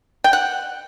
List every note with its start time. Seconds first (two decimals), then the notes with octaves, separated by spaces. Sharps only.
0.24 G5
0.33 F#5